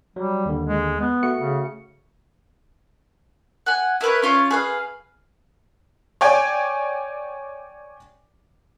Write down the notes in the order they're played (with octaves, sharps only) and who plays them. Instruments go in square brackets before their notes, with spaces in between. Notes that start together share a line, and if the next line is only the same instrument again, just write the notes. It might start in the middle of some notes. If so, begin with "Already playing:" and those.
[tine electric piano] F#3 [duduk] G3
[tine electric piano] D#2 D3
[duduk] G#3
B3
[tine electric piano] A3 F#4 C#7
[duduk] C#3
[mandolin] F#5 G#5
E4 A#4 B4 C#5
C#4 F4 C#5
G#4 B4 F5
[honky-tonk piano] C#5 D5 G5 G#5